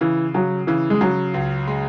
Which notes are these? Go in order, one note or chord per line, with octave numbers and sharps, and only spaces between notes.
C#3 E3
C#3 F#3
C#3 E3
G#3
C#3 F#3
C#2
G#3